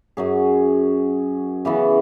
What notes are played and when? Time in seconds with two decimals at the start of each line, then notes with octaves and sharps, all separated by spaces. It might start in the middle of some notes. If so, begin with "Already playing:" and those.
0.17 F#2 F#3 C#4 G#4
1.65 C#3 E3 B3 F#4